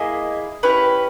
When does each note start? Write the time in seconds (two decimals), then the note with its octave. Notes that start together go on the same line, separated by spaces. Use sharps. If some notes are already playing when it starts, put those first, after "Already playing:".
Already playing: A#3 E4 G#4 D#5
0.63 C#4 E4 G4 B4